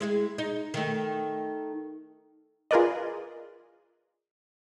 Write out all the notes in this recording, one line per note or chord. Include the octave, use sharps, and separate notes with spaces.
G#3 E4 G#4
D#4
D#3 A3
F4 G#4 A#4 B4 D5 D#5